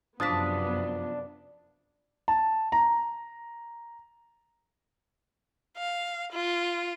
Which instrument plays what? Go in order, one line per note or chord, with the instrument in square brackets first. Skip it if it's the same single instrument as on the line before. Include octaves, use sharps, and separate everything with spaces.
[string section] F#2 C3 B3 [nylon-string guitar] F3 A5 [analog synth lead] D4 [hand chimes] D#6 B6
[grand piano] A5
A#5
[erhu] F5
F4